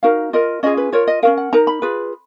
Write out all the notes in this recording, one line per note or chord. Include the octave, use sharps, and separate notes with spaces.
D#4 F#4 A#4 F5
F4 A#4 D#5
C#4 F4 G#4 D#5
B4
F4 A#4 C#5
D#5
C#4 F#4 A#4 F5
F#5
D#4 A#4 A#5
B5
F4 G#4 B4